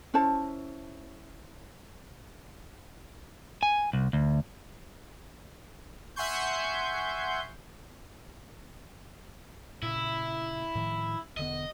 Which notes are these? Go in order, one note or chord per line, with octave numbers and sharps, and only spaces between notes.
C#4 E4 C5 A5
G#5
C2
D2
E5 F#5 G#5 C6 C#6 G6
A#2 C#3 E4
A2 D#3 F3
E1 D3 B3 D#5